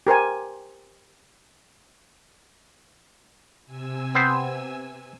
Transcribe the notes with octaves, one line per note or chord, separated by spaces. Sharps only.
G4 A#4 C5 G#5
C3 G#5 E6
B3 C4 C5